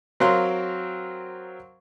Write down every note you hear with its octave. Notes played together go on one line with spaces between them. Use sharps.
F#3 C4 A#4 F5 C6 F#6